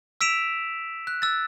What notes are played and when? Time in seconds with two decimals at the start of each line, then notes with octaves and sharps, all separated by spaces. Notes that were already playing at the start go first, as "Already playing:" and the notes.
0.21 E6 B6 D7 E7 F7
1.07 F#6
1.22 E6 F#6 A6